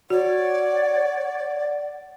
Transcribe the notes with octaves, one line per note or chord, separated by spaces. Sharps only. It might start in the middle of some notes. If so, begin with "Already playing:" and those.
F#4 C#5 D5 F#5